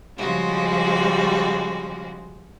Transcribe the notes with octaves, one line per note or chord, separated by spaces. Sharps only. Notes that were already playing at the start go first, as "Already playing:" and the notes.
C#3 F3 G3 G#3 F#4